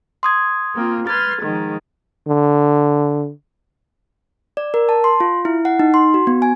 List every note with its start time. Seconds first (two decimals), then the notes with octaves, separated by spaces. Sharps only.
0.23 C6 D#6 G#6
0.73 A#3 C4 F4
1.07 B4 C6 F6 G#6 A6
1.41 G#2 D#3 F3
2.28 D3
4.57 D5
4.74 A#4
4.89 A5
5.04 C6
5.20 F4
5.45 E4
5.65 F#5
5.79 D#4
5.94 C6
6.14 F#4
6.27 B3
6.42 G#5